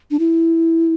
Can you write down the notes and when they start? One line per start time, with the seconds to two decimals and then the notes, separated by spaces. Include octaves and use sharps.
0.11 D4
0.19 E4